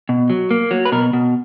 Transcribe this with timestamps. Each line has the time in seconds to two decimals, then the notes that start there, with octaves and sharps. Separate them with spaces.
0.09 B2
0.30 F#3
0.51 A#3
0.71 F#3
0.85 B4
0.92 B2 A#4
1.13 B2